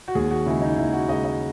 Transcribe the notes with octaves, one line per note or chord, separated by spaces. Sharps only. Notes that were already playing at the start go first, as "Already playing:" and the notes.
F#4
D#2 G#4
F#4
C#3 G#3 E4
D#4
D#2 E4
F#4
C#3 G#3 D#5
D#5